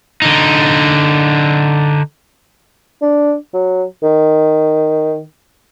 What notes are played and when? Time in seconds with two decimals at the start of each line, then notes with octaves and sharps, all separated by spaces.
0.22 D3 D#4
3.02 D4
3.54 F#3
4.03 D#3